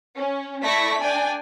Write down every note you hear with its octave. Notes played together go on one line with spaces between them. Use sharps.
C#4
A3 E4 D5 C#6 A#6 B6
D4 D5 G5 G#5